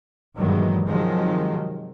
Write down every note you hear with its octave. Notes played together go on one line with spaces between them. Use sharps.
G2 A#2 D#3 E3 F#3 G#3
C3 D#3 F3 F#3 G#3